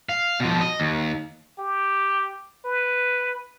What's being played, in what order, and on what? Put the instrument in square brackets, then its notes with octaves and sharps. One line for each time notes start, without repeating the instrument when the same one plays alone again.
[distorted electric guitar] F5
B2 F3
D#5
D#2
[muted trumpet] G4
B4